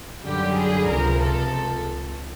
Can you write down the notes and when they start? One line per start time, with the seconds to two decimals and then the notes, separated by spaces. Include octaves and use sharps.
0.25 F#2 D3 G3 G4
0.58 G#4
0.91 C#2 C3 F3 A#4
1.24 A4